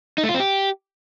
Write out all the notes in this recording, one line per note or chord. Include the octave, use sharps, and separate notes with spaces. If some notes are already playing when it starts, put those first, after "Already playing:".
D#4
A3
F4
C4
G4